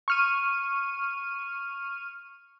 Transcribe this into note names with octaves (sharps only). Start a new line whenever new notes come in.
C#6 F6 D#7